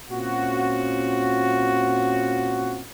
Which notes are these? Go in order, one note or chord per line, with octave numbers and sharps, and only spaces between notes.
A#2 C4 C#4 F4 F#4